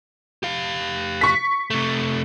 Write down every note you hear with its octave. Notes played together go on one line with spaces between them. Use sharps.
G4 F5
C#6 B6
C3 A3